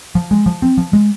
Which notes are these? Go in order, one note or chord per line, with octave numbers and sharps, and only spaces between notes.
F3
G#3
F3
C4
F3
G#3